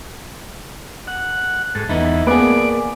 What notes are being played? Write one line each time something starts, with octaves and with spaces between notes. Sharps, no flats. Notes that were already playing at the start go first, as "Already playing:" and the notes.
F#5
G#2 A4
E2 B3 D#4 E4
A#3 B3 G#4 D5